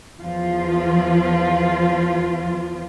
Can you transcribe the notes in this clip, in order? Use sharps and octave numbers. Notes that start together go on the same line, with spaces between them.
E2 F3 F4